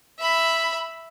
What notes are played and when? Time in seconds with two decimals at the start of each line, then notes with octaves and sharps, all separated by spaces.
0.19 E5 B5